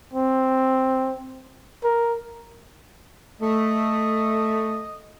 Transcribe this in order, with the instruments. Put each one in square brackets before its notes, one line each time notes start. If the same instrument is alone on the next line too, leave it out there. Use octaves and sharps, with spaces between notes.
[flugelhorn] C4
A#4
[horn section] A3 [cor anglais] D#5